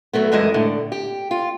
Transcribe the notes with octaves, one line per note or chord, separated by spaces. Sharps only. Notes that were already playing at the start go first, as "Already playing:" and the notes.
F#3 A3 B3
F#2 E3 G#3 A3 E4 D#5
A2 D3
G4
F4